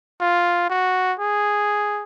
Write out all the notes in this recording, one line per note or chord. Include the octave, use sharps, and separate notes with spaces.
F4
F#4
G#4